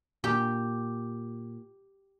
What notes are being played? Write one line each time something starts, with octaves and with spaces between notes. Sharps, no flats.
A#2 G4